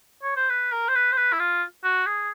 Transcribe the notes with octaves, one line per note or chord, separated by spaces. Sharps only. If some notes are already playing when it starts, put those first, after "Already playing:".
C#5
C5
B4
A#4
C5
B4
C5
B4
E4
F4
F#4
G#4